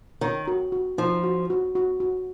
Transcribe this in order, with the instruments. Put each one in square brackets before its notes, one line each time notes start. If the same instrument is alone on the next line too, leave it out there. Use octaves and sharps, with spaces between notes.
[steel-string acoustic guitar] D#3 [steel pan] C#5
[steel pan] F#4
F#4
[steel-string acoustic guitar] F3 [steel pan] D#4
[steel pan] F#4
F#4
F#4
F#4